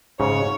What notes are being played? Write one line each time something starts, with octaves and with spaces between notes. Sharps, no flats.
G#2 C#3 C#5